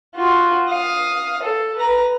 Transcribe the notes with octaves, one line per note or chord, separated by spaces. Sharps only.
F4 F#4
F5 D#6
A4
B4 A#5